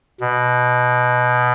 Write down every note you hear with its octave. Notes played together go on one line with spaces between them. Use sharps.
B2